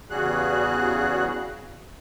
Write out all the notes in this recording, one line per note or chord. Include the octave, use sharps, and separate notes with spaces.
E2 C#3 G3 F#4 G#4 F#6